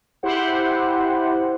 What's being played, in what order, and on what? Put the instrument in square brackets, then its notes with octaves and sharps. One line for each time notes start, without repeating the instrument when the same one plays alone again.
[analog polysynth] E4 G4 C5 F#5